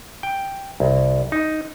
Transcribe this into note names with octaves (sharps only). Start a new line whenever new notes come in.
G5
C2
D#4